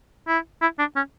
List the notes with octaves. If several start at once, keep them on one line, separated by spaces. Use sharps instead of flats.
E4
E4
D4
C#4